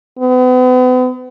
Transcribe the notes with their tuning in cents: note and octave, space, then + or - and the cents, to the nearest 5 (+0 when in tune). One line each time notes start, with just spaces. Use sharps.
B3 +40